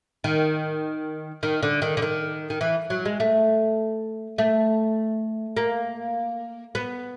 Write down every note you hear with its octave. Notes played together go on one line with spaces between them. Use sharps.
D#3
D#3
D3
D#3
D3
D#3
D#3
E3
F#3
G#3
A3
A3
A#3
B3